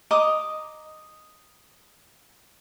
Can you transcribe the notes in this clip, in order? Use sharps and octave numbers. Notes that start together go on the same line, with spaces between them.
D#5 A#5 D6 D#6